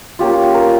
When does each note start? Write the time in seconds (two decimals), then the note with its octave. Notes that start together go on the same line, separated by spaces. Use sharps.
0.19 A#3 C#4 F4 G4
0.31 F4
0.54 A#4